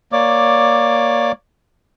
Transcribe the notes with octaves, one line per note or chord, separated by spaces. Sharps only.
A#3 C#5 D5 D6